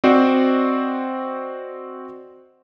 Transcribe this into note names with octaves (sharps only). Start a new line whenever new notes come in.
C4 F#4 C5 D5 D#5